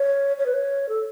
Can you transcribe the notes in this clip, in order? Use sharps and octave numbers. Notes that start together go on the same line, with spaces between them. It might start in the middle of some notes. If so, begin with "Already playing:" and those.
Already playing: C#5
C#5
B4
C#5
A4